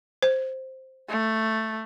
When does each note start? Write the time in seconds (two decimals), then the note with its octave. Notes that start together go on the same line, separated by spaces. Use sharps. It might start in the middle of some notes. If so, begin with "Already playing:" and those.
0.23 C5
1.09 A3